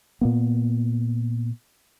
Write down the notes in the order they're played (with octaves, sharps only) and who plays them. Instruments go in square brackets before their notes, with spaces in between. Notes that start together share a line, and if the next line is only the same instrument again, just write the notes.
[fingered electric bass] A#2 A#3 B3